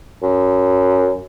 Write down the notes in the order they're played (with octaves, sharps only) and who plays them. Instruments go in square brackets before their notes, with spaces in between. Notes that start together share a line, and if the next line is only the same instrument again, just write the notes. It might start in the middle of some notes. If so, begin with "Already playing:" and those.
[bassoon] F#2